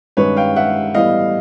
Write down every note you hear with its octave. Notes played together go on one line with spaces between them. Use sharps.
G2 D#3 G#3 C#4 B4 C#5
F5 G5
E5 F#5
A2 E3 G3 B3 D#5 F5